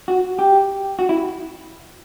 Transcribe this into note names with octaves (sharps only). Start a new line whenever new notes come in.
F#4
G4
F#4
E4